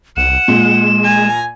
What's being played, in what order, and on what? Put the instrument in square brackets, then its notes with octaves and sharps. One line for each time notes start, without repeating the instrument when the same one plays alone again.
[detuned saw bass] C2 [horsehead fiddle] F#5 [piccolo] E7
[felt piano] A#2 [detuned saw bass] G#3
[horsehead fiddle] G#5 A#5